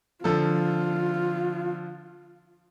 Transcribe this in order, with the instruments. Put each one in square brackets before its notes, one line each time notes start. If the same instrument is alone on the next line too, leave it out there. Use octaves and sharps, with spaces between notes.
[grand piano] D3 F3 A4 [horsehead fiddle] F4